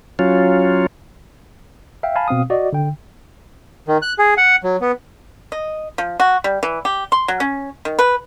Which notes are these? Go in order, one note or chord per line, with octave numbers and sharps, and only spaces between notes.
F#3 C#4 F4
E5 F5 G5
F5 G#5 A5 B5
B2 C4 F5 D#6
F#4 D5 D#5
D3 G5
D#3
F#6
G#4
F#5
F#3
B3
D#5
F3
F#4
G3
E3
G4
C6
F#3
C#4
D#3
B4